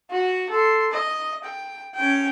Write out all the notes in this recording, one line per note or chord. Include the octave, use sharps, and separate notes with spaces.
F#4
A4 C6
D#5
G5
C#4 G5